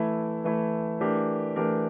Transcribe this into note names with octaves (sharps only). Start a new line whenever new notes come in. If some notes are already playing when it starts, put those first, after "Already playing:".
Already playing: E3 A3 E4
E3 A3 E4
E3 A3 D4 G4 A#4
E3 A3 D4 G4 A#4